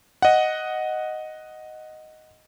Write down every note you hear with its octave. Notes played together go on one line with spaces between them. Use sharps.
D#5 F#5